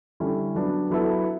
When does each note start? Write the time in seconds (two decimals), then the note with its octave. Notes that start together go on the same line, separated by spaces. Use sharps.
0.20 D3 G3 C#4 E4 A4
0.55 F#3 B3 D4
0.90 F#3 B3 E4 A4